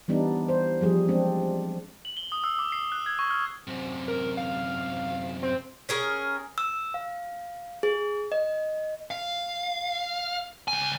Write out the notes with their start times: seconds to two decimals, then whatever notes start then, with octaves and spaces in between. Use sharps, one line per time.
0.08 E3 G3 B3 D4 D#4
0.49 C5
0.81 F3 G3 G#4
1.08 G#3 C4 D4
2.05 F#7
2.17 G7
2.32 D#6
2.44 E6
2.59 D6
2.72 C7
2.92 F#6
3.06 G#6
3.19 C#6
3.30 F6
3.67 F#2 C3
4.08 A#4
4.37 F5
5.43 C4
5.89 C#4 G#4 A#4
6.58 E6
6.94 F5
7.83 G#4
8.32 D#5
9.11 F5
10.68 C#2 G#5